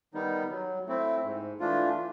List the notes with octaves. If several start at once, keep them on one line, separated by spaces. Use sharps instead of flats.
D#3 G3 B3 D#4
F#3
A3 C4 E4
G#2
E3 A3 D4 F4